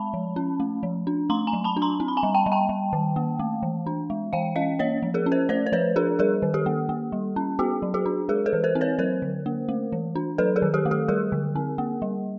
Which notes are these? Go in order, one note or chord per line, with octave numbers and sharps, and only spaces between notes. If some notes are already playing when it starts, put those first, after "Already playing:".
Already playing: G#3 A5 B5
F3
C#4
A3
F3
D4
A3 A#5 C6
G#5 A#5
F#3
A5 B5
D4
A#5 C6
C4
B5
G#5 A#5
G3
G5 A5
G3
G5 A5
G3
D#3
A#3
A3
E3
D4
G#3
E3 F5 G5
C#4 D#5 F5
A#3 C#5 D#5
F3
G#4 A#4
C#4
A#4 C5
A3 C5 D5
C5
F3 B4 C#5
D4 G#4 A#4
G3 G#4 A#4
D#3
G4 A4
A#3
A#3
G3
C#4
B3 F#4 G#4
F#3
F#4 G#4
D4
G#3 G#4 A#4
A4 B4
E3
A#4 C5
C4
B4 C#5
F#3 A#4 C5
D3
A#3
A3
E3
D4
F#3 A4 B4
G#4 A#4
D#3
G4 A4
A3
G4 A4
G3 G#4 A#4
D3
C4
A#3
G3